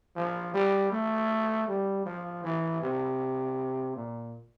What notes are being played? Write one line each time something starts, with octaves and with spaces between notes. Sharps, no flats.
F3
G3
A3
G3
F3
E3
C3
A#2